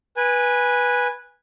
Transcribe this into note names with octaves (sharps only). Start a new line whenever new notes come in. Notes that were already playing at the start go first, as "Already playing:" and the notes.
B4 G#5